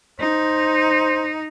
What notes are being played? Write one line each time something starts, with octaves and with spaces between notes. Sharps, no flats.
D#4 C5